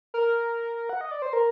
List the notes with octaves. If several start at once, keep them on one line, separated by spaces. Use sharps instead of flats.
A#4
F#5
D#5
D5
C5
A#4